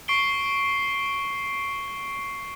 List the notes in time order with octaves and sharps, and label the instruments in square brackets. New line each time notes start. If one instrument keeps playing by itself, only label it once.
[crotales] C#6 C7 D7 G7